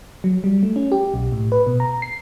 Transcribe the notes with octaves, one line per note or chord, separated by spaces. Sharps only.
F#3
G3
A3
C#4
G4
B1
A2
B4
B2
A#5
C7